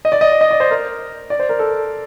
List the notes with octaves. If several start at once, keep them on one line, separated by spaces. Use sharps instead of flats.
D#5
D5
D#5
D5
D#5
D5
C5
A#4
D5
C5
A#4
A4